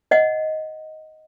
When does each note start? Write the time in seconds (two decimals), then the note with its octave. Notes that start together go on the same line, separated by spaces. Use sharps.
0.11 D#5 F#5